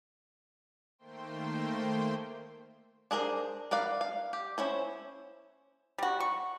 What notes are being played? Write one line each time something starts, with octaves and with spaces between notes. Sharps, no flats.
D#3 A3 A#3 C5 G5 C6
D4 G#4 A#4 C5
A#4 B4 D5 F5
F5
G4
C#4 E4 C5
G3 F#4
C#6